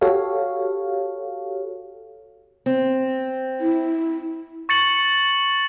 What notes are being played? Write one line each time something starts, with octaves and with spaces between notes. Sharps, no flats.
F#4 G4 A4 C#5 F5
C4
E4
C#6 A6 C#7 F#7